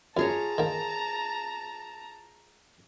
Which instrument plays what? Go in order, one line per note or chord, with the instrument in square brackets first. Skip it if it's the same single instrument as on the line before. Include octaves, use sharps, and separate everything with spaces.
[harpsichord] F#2 [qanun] F4 G#4 C#5 [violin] A5 A#5
[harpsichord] D#3 A#3